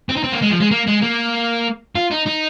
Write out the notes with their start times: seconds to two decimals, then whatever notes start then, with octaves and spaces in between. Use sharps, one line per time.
0.09 C4
0.17 D#4
0.24 C4
0.32 A#3
0.42 G#3
0.50 F3
0.60 G#3
0.71 A#3
0.87 G#3
1.02 A#3
1.95 F4
2.11 D#4
2.26 D#4